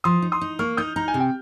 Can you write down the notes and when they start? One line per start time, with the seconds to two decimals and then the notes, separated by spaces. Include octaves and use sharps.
0.04 F3 C6 D#6
0.22 D#4
0.32 C6 D#6
0.41 D#4
0.59 A#3 C#6 F6
0.77 D#4 D#6 G6
0.96 D#4 A#5
1.08 G#5
1.14 C3
1.20 G5